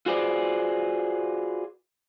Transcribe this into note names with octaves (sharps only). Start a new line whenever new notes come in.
F4 F#4 G#4 B4 C5 D5